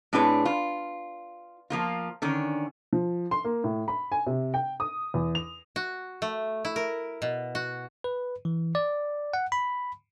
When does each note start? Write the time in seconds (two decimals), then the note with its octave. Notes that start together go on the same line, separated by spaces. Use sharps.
0.13 A2 C4 D4 G#4 B4 C#5
0.45 F4
1.70 F3 A#3 F4
2.22 D3 D#3 C#4
2.93 F3
3.31 C6
3.45 A#3
3.64 A2
3.88 B5
4.12 G#5
4.27 C3
4.54 G5
4.80 D#6
5.14 E2
5.35 F7
5.76 F#4
6.22 A3
6.65 E4
6.76 A#4
7.22 B2
7.55 F#4
8.04 B4
8.45 E3
8.75 D5
9.34 F#5
9.52 B5